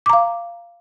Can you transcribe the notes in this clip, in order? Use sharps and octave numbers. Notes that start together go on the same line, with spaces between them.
F5 A#5 D6